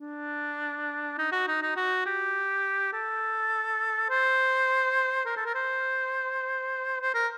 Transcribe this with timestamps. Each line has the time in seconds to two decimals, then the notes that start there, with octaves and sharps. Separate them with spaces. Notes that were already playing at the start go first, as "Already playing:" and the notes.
0.01 D4
1.18 D#4
1.32 F#4
1.48 D#4
1.62 D#4
1.76 F#4
2.06 G4
2.93 A4
4.10 C5
5.26 A#4
5.37 A4
5.46 A#4
5.55 C5
7.01 C5
7.14 A#4